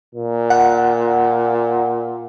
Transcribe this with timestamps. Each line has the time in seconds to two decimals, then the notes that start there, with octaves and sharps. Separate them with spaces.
0.15 A#2
0.50 F#5